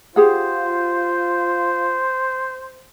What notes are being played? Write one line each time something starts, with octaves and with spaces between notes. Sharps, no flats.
F4 G4 G#4 C5 F#5